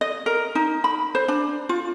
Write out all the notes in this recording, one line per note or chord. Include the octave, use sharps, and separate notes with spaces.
D#5
A#4
D#4
B5
C5
D4
F4